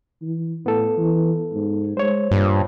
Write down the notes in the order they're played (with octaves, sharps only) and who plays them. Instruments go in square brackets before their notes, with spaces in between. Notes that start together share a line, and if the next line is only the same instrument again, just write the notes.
[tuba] E3
[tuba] A2 [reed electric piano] B3 A4
[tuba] E3
G#2
[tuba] G#3 [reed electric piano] C5 C#5
[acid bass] G2 [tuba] A#2